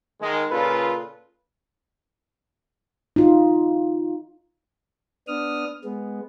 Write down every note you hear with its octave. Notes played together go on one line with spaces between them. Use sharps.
D#3 G#3
A#2 C#3 F4 A4 B4
D#4 F4
B3 D4 D#6 F6
G#3 B3